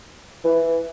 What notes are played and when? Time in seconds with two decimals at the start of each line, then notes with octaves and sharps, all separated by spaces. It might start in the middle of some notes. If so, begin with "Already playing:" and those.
0.44 E3